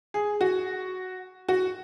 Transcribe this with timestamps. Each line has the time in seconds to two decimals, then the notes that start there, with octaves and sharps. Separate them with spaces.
0.14 G#4
0.41 F#4
1.49 F#4